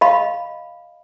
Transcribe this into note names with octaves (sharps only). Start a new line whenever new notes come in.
D#5 F5 B5